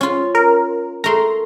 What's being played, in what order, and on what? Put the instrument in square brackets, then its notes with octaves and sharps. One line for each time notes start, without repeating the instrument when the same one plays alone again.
[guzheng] C#4 F4
[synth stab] A#4
[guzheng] A3 A#4 [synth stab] A#5 C6